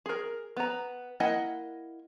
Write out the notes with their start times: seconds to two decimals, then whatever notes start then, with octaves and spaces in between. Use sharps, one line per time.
0.06 G#4 A#4
0.57 B3 A#5
1.20 A#3 E4 D#5 F#5 G#5